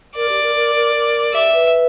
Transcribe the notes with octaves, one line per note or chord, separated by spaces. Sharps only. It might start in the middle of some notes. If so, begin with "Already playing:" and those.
A#4 D5
G4
A#4
A#4
A#4
A#4
G4 E5
B4